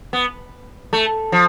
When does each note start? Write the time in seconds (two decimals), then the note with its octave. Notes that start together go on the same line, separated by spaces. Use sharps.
0.13 B3
0.93 A3
1.32 F3